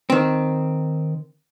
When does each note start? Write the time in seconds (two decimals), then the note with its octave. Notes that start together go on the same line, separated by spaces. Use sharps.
0.10 D#3 C4